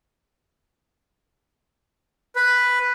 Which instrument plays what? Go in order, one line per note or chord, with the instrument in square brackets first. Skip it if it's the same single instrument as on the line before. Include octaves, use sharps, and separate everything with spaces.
[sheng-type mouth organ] B4